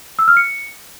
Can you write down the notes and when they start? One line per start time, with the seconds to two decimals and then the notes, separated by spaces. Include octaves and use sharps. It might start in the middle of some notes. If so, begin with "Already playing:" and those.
0.19 E6
0.28 F6
0.37 C#7